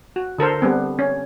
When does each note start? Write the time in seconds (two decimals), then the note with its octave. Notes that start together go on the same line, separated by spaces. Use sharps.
0.16 F#4
0.39 D3 A4 A#4 C5
0.62 G3 B3 C4
0.99 C#4